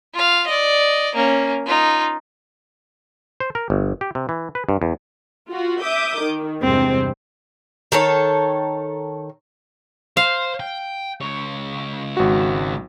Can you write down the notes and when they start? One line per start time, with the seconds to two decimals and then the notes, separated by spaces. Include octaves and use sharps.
0.14 F4 F5
0.47 D5 D#5
1.15 A#3 C#4
1.65 D#4 F4
3.40 C5
3.55 A#4
3.70 G1
4.01 G4
4.15 C3
4.29 E3
4.55 B4
4.69 G2
4.82 E2
5.52 F4 F#4
5.82 E5 D6 D#6 G6
6.21 D#3
6.62 E2 G2 C3 G#3 C4
7.92 D#3 A4 C#5
10.17 C5 F5
10.60 G5
11.21 C#2 C#5
12.17 G#1 F#4